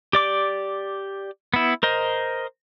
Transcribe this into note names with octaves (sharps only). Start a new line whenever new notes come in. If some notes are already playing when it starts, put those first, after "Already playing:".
G4 D5 D6
B3 E4
A#4 C5 D#5